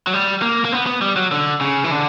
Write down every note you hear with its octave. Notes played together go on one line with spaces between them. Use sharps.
F#3
G3
A#3
A#3
B3
B3
G3
F#3
D3
C#3
E3
D3